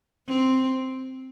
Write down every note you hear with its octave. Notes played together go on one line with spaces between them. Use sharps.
C4